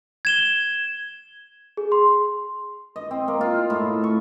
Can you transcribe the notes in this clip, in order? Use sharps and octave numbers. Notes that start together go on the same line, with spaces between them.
G#6 E7 G7
G#4
C6
D#5
C4
A#3
F4
A2
C#6